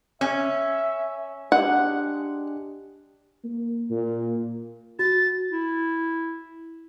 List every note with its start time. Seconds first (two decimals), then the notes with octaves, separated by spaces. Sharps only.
0.21 C#4 E5
1.52 G#3 D4 G4 F#5
3.44 A#3
3.90 A#2
4.99 F#4 A6
5.51 E4